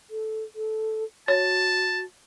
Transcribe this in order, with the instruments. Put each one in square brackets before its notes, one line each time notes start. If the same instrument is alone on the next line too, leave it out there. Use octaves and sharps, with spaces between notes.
[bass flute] A4
A4
[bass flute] F#4 [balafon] C#5 [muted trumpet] A5